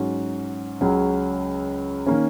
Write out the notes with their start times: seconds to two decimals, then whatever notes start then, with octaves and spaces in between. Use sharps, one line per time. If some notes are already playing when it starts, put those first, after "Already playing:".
Already playing: G#2 F#3 C#4 F#4
0.81 C#2 C#3 F#3 C#4
2.07 D#3 A#3 C#4